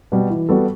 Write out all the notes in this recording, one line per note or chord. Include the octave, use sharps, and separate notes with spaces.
B2 G3
E3
G3 B3 F#4 A4